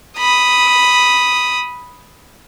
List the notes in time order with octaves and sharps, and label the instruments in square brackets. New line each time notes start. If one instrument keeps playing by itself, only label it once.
[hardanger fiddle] B5 D#6